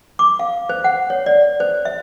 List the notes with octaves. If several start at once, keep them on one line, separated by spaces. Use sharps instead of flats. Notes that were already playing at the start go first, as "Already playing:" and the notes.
D6
F5
C5
F#5
C#5
D5
C5
E5